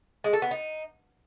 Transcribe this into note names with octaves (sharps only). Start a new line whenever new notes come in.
G#3
A4
B3
D#4